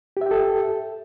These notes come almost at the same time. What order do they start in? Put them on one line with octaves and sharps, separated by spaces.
G4 E5 G5 A4